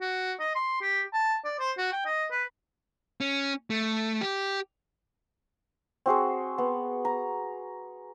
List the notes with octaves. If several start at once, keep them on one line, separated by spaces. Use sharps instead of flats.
F#4
D#5
C6
G4
A5
D5
C5
F#4
G5
D#5
B4
C#4
A3
G4
C4 F#4 G#4 C5
B3
A#5